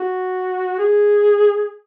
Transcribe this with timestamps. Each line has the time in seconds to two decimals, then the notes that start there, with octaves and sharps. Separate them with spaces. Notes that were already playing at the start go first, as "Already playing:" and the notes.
Already playing: F#4
0.79 G#4